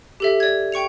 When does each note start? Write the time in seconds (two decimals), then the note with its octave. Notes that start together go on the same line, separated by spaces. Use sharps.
0.20 G4 A4 E5
0.40 D5 G#6
0.72 G5 C#6 C#7 F7